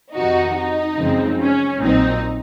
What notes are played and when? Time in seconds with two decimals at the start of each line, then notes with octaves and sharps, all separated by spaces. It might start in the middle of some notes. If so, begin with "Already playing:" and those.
0.15 F2 C3 D#3 D#4 F#4
0.57 D#4
0.98 F#2 C#3 F3 G#3 C4
1.40 C#4
1.81 A#1 A#2 F#3 C4 D#4